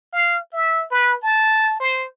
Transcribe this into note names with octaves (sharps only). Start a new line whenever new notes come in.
F5
E5
B4
A5
C5